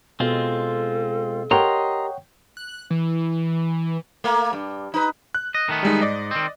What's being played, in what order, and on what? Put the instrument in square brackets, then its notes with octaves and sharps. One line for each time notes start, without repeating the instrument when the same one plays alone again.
[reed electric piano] B2 [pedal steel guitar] G#3 C4 F4 [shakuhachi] A4
[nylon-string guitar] G4 A#4 [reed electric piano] C#5 F#5 G5 [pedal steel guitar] D#5 A#5 C6
[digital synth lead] F#6
E3
[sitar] A3 A#3
G2
D#4 B4
[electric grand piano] F#6
[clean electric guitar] D#5
D#3 A3 B3
[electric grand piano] G3 G#3 D#4
[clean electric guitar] G#2 [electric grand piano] D5 D#5
[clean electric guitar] D#3 C4